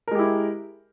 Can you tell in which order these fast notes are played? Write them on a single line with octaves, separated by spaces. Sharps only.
A#4 G#3 G4 E4